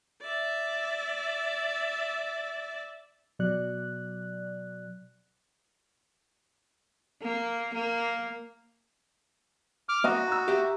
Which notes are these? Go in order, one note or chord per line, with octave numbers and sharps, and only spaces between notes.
D5 E5
B2 F#3 D5 F#6
A#3
A#3
D6 F6
A#3 F#4 D#5 D#6
A#5 E6
G4 E5 F#5